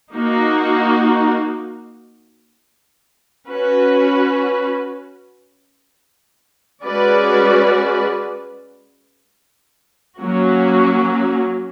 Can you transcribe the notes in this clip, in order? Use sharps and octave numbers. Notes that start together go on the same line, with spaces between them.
A#3 D#4 F#4
C#4 F#4 B4
G#3 C#4 F#4 B4 D5
F#3 A#3 C#4 F#4